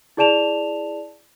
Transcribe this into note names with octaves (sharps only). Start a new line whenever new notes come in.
E4 G#4 D5 A5 E7 F7